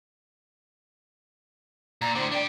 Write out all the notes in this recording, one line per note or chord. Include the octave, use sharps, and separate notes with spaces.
A#2 A#5
A2 D3 C5
D4 D5 G5